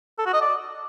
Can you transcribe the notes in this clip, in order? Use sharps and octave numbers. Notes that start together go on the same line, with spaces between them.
A4
F#4
D#5
D5